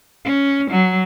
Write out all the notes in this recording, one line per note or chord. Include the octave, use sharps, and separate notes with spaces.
C#4
F#3